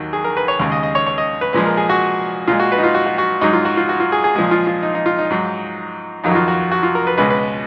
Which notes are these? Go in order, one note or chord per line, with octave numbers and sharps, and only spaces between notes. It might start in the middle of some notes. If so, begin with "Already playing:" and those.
Already playing: D#2 D#3 F#3
G#4
A#4
B4
C#5
D#2 C#3 G#3
D#5
D#5
C#5
C#5
D#5
B4
A#2 F3 G#3 B4
A#4
G#4
F#4
A#2 G#3 F4
F#4
B4
D#4
F4
F#4
F#4
F#4
G#2 F#3 D#4
F4
F#4
F4
F#4
F4
G#4
G#4
A#2 F3 G#3 G#4
F4
F4
D#4
D#4
F4
D#4
G#2 F#3
F2 D#3 F#3 D#4
F#4
F4
F#4
F#4
F4
A#4
B4
C#2 B2 G#3 B4
B4